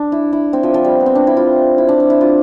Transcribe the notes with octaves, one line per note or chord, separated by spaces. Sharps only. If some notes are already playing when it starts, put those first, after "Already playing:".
Already playing: D4
E4
E4
C4
F3
F3
G3
B3
C4
D4
E4
F4
E4
D4
D4
E4
F4